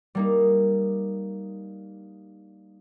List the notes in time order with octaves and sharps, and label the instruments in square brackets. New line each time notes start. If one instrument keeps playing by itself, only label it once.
[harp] G3 A#3 D#4